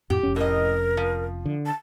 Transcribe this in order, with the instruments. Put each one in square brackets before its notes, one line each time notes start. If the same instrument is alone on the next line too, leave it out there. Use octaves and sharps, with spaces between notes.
[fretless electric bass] F2 A2 [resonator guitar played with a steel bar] G4
[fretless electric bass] F1 F2 C#4
[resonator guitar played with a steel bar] A2 D#5 [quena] A#4
[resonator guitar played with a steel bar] F3
[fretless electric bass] D3
[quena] A5